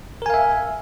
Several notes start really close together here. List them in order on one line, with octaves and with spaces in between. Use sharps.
A#4 G#5 F5 E5